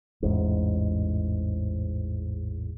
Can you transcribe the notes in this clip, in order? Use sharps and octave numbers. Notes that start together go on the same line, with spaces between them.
A1 E2 G#2